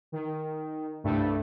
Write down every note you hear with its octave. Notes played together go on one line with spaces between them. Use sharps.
D#3
C2 G2 G3 A3